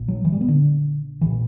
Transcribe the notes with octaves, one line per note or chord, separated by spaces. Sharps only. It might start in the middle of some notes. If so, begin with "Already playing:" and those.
Already playing: A#1 A#2
F#3
E3
G3
B3
D3
A#1 A#2 E3